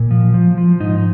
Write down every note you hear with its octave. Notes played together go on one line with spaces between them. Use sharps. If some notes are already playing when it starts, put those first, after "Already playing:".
Already playing: A#2
F3
F3
F3
G#2 D#4